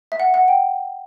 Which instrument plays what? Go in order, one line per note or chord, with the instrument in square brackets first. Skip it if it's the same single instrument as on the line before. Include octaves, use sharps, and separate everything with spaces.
[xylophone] E5
F#5
F#5
G5